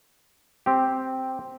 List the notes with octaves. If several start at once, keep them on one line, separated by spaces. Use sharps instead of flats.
C4 G4